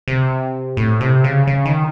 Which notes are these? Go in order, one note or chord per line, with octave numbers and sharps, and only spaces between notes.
C3
A2
C3
C#3
C#3
D#3